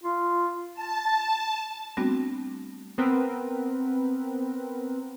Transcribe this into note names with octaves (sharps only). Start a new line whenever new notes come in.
F4
A5
G3 A3 B3 C4 D4 F#4
B3 C4 A#4 B4